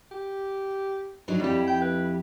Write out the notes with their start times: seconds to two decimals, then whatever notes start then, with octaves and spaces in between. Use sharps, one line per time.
0.12 G4
1.28 F#3 D4 D#4
1.40 F2 G3 E4 G4
1.67 G5
1.82 B4